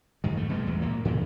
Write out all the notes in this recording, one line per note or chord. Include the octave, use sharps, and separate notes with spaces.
F2 G#2 D#3
A3
B2 G3 G#3
A1 E2
D2 A#2 A#3
A2 C#3 E3